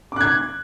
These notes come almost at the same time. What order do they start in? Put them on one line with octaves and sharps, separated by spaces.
D6 F#6 G#6